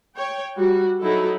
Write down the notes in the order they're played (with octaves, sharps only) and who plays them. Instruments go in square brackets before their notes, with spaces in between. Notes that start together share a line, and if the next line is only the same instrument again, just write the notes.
[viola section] C#5 G5
G3 F#4
F#3 D#4 E4 A4